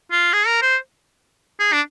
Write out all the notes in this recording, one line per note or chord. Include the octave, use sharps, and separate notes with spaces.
F4
G#4
A#4
C5
G#4
D4